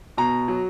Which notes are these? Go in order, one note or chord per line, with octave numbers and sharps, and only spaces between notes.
B2 A#5
F#3